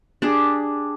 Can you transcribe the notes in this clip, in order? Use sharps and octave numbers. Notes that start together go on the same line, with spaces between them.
D4 G4 G#4